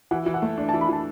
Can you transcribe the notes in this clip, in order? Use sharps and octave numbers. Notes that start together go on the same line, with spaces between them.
E3 F#5
E3
F#5
A3
D4
A5
E3
B5
E3 A5